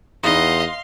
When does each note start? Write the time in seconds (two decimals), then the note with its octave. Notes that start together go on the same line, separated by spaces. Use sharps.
0.23 E2 B3 D#4 D#5 F5 C6